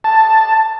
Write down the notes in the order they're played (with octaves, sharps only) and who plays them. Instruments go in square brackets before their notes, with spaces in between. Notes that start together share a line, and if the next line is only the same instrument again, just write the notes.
[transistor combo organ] A5